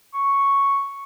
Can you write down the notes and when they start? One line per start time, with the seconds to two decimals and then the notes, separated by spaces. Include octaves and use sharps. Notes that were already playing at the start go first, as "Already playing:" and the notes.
0.14 C#6